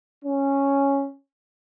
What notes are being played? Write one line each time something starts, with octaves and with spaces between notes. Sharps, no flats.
C#4